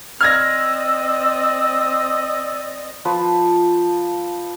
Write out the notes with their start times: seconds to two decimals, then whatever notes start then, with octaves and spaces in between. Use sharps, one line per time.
0.21 C4 D5 D#5 E6 F6 G#6 A#6
3.05 F3 F4 B4